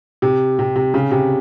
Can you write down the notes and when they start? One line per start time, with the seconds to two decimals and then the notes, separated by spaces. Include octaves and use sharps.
0.22 C3
0.59 C3
0.76 C3
0.94 C#3
1.11 C3